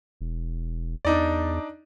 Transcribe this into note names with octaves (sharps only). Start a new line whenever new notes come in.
E1
E2 D4 D#4 D5